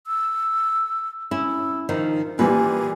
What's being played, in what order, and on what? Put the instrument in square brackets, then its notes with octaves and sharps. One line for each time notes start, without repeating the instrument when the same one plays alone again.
[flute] E6
[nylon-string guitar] C#4 E4 [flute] E6
[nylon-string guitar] D#3 F3 D#4 [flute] A#4
[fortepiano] A#2 E3 G3 [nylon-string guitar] B4 [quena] G#5